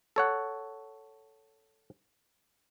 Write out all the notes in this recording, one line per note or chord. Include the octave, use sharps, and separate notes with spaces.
A4 C#5 F#5